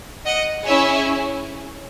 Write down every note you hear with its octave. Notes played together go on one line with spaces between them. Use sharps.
D#5 F#5
C#4 E4 G#4 C#5 E5